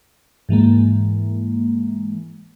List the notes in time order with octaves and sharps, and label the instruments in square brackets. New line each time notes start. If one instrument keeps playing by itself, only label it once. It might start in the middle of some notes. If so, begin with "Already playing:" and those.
[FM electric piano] G#2 E3 G#3 A#3